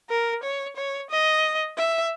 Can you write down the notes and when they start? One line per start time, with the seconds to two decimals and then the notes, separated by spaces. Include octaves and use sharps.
0.10 A#4
0.43 C#5
0.77 C#5
1.11 D#5
1.78 E5